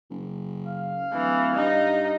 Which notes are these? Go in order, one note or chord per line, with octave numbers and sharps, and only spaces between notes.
F#1
F5
D1 E3
G2 D#4